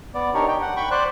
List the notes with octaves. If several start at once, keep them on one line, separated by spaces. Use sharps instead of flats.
B3 D5
D4 D#4 G4 A#4 C#5
G5
F#5
G5 B5 C#6
C5 D5 F#6